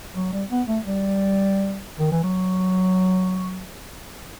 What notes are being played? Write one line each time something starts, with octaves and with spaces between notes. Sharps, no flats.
F#3
G3
B3
A3
G3
D#3
E3
F#3